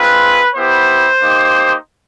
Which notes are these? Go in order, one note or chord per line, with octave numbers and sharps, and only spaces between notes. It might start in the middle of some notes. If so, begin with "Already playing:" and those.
Already playing: G#3 C4 F4 B4
B3 E4 G4 C5
A#3 D#4 G4